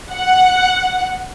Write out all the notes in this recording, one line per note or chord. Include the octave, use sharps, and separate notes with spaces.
F#5